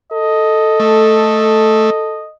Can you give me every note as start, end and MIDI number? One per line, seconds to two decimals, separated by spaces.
0.12 2.26 69
0.12 2.34 75
0.80 1.90 57